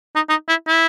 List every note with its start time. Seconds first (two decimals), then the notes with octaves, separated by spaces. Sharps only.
0.15 D#4
0.29 D#4
0.48 E4
0.67 E4